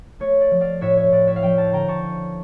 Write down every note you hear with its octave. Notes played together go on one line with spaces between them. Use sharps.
A3 C#5
D5
F3
D5 F5
A2 C#5 E5
C#5
A2 D5
C#5 E5
F5
F3 E5 G5
F5 A5
D3 G5 A#5
A5 C#6
C#4